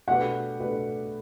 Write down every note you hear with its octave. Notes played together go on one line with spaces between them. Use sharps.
B2 A3 D4 G4 B4 F#5
B2 A3 D4 G4 B4